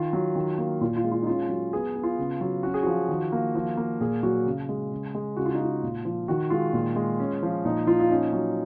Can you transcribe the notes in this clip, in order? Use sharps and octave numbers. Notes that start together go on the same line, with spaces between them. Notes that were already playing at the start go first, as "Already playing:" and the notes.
Already playing: D#3 F4
F#3
D#3
A#3
A#2 F4
F4
G#3
F4
D#4
C#4 F4
F#3
B3 G#4
B3
F4
C#3
F#3
C#4 F#4
G#4
F3 F#4
D#3
A#3
F3
A#3
A#2 G#4
F#3 F#4
C#3
G#3
C#3
G#3
C#3 F#4
F4
D#4
G#3 F4
A#2
F3
D#3 F#4
G#3 F4
A#2
G#3
C#4
F3
A#2 D#4
F3 F4
F4
C#4 D#4
F#3